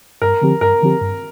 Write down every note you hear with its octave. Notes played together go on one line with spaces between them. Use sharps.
G2 A#4
D3 F3 C4 G4
G2 A#4
D3 F3 C4 G4
G2